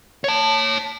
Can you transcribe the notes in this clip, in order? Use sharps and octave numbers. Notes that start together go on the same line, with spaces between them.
C#5 A5